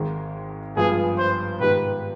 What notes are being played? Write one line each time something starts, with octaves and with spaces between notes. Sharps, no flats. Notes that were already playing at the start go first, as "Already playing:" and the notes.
Already playing: G#1 G#2 D#3 G#3
G2 F3 G#3 B3 F4 G#4
C5
G#2 D#3 B3 D#4 G4 B4